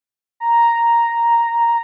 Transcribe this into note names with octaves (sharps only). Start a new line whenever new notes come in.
A#5